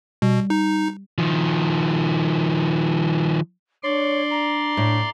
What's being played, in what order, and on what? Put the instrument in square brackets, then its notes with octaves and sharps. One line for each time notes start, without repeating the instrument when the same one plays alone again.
[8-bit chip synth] B2 [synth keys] G3
[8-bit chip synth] D#4
[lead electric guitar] D#3 F3
[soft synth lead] D4 [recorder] C#5 [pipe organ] D5 C6
[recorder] A#5
[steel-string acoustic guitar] A2